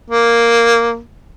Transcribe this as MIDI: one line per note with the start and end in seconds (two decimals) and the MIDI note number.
0.10 0.99 58